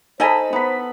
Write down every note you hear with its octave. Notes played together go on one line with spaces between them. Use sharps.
D#4 A4 C5 D#5 G#5 A5 B5
B3 D#4 B5